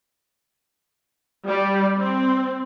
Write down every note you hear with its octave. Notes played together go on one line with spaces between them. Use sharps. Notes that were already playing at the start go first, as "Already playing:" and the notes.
G3
C4